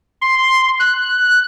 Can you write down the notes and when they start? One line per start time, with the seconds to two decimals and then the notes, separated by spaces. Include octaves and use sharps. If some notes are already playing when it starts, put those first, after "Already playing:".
0.22 C6
0.79 F#6